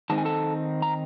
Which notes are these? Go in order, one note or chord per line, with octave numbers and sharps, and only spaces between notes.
D#3 G#3 C4 D#4 A5
G#5
A4 A5
A#5